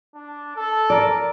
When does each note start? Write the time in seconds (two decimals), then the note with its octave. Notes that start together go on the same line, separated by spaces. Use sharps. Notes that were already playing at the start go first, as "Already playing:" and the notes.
0.15 D4
0.56 A4
0.90 A#4 D5